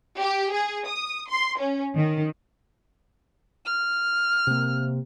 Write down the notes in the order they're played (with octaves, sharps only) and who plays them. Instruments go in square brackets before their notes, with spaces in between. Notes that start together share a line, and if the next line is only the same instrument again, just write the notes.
[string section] G4
G#4
D#6
C6
C#4
D#3
[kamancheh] F6
[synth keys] C3 A#3